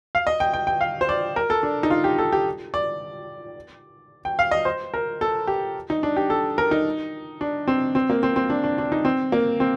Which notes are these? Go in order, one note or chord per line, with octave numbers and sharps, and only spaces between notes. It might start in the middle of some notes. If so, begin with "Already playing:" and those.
F5
D#5
G5
G5
G5
F5
C5
D5
A#4
A4
D4
D#4
F4
G4
A4
G4
D5
G5
F5
D#5
C5
A#4
A4
G4
D#4
D4
G4
A4
A#4
D#4
D4
C4
C4
A#3
C4
C4
D4
D4
D4
D#4
C4
A#3
C4